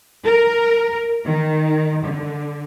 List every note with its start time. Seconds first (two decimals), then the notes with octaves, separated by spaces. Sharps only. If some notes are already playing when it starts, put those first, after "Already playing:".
0.24 A#4
1.24 D#3
2.05 D3